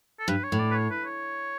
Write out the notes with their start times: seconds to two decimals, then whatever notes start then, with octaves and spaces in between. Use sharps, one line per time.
0.19 A4
0.28 G2 B4
0.43 C#5
0.52 A2
0.59 D5
0.71 B4
0.74 C#5
0.90 B4
1.05 C#5